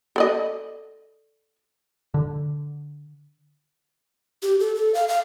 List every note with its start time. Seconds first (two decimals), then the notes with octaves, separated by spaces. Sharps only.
0.16 A4 D5 D#5
2.14 D3
4.43 G4
4.60 A4
4.76 A4
4.95 F5
5.08 F5